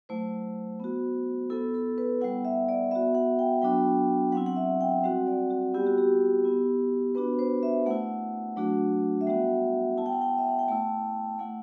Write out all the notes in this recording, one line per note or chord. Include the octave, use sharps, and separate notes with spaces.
F#3 A3 E4 C5
B3 F#4
B3 E4 A4
A4
B4
G3 B3 E4 F#5
E5
D5
B3 F#4 E5
F#5
G5
F#3 B3 D4 F#4 G5
F#3 C4 E4 F#5
F#5
E5
G5
G3 C4 F#4 F#5
D5
F#4
G3 B3 E4 G4
F#4
G4
B3 E4
B3 D4 F#4 B4
C5
E5
A3 E4 F#5
F#3 A3 D4 F#4
E5
G3 B3 F#4 F#5
B3 E4 A5
G5
F#5
G5
E5
F#5
G5
A3 E4 A5
A3 E4 F#5